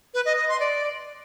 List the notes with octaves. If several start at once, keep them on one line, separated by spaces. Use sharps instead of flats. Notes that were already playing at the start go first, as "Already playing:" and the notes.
B4
D#5
D#5
C6
D5